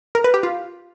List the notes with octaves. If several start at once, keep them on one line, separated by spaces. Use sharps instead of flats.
A#4
B4
G4
F4